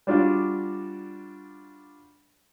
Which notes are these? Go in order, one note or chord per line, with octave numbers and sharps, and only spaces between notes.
G3 D4 F4 F#4